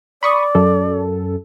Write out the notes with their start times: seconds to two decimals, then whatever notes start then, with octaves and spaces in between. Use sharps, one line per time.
0.23 D5 B5 C#6 D#6
0.55 F#2 A4